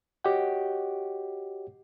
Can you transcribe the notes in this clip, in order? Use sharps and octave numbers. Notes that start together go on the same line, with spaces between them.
F#4 G4 C#5 D#5 F#5 G5